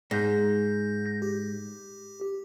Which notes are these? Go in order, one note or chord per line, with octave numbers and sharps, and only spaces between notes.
G#2 G6 A#6
G4